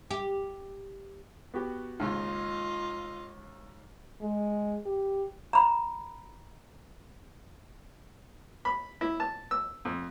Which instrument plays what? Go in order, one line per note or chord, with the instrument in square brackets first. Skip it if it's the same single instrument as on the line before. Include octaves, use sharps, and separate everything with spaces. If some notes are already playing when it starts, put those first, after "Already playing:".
[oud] G4
[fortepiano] B3 F#4 G4
[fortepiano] D#2 G#2 C#3 [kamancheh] F4 D#5
[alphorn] G#3
G4
[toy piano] A#5 B5
[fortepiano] B5
E4
A5
E6
F2